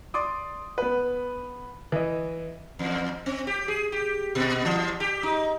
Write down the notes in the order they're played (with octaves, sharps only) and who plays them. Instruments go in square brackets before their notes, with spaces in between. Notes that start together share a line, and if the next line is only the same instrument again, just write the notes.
[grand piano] D5 C6 D6 D#6
B3 B4
E3 D#5
[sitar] E2
C4
G4
G#4
G4
A#2
E3
G4
D#4